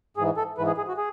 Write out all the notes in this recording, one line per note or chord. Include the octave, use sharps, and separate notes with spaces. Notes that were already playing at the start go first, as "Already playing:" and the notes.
G#2 E3 G#4
A4
G#2 E3 B4
G#4
G#4
F#4
G#4